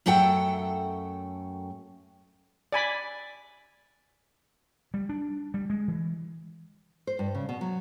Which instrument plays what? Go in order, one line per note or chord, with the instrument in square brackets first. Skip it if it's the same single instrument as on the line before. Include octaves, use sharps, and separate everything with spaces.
[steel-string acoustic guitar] F#2 A3 A4 F#5 G5
[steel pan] D5 G#5 B5
[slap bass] G3
D4
G3
G#3
E3
[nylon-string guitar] C5
G2
C#3
B2
F#3